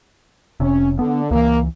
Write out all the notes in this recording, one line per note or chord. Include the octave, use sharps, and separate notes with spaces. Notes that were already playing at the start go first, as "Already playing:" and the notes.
F1 C3 C#4
D3 B3
C#2 E3 A#3